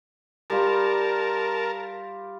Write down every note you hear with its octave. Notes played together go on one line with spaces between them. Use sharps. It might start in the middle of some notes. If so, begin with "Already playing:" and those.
G3 F4 A#4 A5